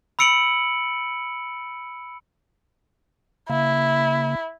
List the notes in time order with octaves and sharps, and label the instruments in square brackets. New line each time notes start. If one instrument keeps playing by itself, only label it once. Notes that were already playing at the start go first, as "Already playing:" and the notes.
[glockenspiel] B5 E6 C#7 D7 F#7
[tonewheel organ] C#3 A#3 [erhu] E4